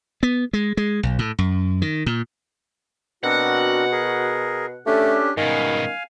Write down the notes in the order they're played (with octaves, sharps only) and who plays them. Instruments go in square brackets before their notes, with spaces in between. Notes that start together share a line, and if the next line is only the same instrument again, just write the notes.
[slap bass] B3
G#3
G#3
B1
A2
F#2
D#3
A#2
[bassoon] B2 [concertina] C4 D4 A#4 [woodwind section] F#4 [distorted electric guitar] F#5
[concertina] G#4 A#4
[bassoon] A3 [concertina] C#4 D4 G4 [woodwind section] A4
[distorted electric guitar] G#2 B2 [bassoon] D#3 [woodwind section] G3 B3 C#4 [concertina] F5 G#5